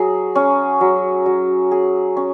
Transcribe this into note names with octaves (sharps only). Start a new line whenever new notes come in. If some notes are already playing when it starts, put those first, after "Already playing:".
Already playing: F#3 G#4
C#4
F#3
F#3
G#4
C#4